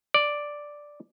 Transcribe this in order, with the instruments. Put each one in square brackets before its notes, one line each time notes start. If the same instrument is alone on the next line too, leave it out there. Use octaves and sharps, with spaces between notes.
[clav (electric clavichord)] D5